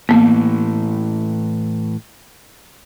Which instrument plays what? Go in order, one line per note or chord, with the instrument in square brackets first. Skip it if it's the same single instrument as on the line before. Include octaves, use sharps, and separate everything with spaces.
[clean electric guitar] A2 E3 [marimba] A#3 B3